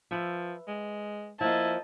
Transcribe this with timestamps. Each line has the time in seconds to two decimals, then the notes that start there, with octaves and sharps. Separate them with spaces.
0.11 F3 B4 E5
0.67 G#3
1.41 F3 A#3 E4 D#5 A5